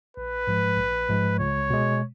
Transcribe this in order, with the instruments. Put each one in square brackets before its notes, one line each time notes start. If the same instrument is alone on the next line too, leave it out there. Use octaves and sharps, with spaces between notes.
[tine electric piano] A#1 [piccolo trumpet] B4
[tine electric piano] G#2 F3 G#3
A#1
G#2 F3 G#3
[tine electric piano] C#2 [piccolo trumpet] C#5
[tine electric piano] B2 G#3